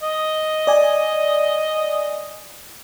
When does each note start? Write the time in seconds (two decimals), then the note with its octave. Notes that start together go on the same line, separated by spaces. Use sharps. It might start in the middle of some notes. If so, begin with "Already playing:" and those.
0.02 D#5
0.67 D5 G#5